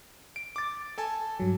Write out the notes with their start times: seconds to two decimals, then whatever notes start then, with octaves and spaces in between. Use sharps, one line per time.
0.36 D7
0.56 D6 A6
0.98 A4 G#5 A5
1.40 G2 F#3